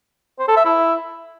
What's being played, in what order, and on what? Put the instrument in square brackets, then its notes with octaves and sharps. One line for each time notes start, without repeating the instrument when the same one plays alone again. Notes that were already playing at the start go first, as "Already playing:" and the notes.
[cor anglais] C5
A4
E5
E4